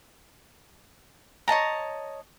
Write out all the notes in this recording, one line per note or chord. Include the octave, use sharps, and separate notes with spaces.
C#5 D#5 A5 A#5